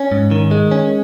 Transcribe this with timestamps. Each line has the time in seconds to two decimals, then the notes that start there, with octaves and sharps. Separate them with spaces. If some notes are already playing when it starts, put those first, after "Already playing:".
Already playing: C#4
0.12 G#2
0.31 D#3
0.51 G#3
0.71 C#4